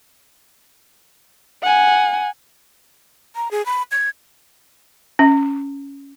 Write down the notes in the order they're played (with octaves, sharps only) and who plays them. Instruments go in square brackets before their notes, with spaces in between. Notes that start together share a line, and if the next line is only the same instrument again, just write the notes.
[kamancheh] F#5 G#5
[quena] A#5
G#4
B5
G#6
[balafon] C#4